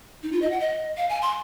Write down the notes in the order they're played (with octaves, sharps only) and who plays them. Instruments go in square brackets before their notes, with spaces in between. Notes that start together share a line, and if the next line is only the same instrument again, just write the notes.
[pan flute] D#4
F4
D#5
F#5
D#5
F5
G#5
C6